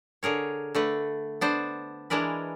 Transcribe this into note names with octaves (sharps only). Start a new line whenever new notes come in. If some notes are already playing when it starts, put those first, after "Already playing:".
D3 G#4 A#4 C#5
D3 A3 B4
B3 D4 C5
E3 G#3 D4 A#4 B4